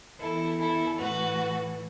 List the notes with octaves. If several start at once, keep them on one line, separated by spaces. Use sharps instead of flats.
E2 E3 E4 A4
E4 A4
A2 E3 F#4 B4